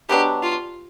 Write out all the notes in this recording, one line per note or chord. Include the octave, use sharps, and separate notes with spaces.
B2 F#3 B3 D4 G4
F4